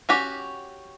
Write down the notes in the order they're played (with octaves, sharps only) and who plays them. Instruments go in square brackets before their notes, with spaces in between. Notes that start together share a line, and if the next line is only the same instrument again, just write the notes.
[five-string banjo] C#4 F#4 G4